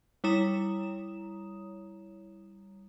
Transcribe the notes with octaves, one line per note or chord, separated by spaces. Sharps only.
G3 E4 C#5 A#5 D#6 E7